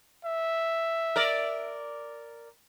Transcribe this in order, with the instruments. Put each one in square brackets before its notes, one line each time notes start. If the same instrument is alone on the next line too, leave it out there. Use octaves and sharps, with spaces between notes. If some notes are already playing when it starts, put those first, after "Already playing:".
[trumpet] E5
[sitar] A#4 D5